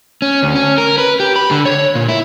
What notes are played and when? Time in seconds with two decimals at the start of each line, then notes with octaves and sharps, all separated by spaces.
0.22 C#4
0.43 D2
0.55 C#4
0.78 A#4
0.98 B4
1.20 G4
1.36 B5
1.51 D3
1.65 C#5
1.95 A#2
2.09 E4